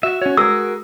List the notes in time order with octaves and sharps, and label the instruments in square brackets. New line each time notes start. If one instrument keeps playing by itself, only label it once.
[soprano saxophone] F#4 [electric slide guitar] E5
[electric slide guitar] C#4 C#5 [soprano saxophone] F#4
[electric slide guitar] G#4 A#4 [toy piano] E6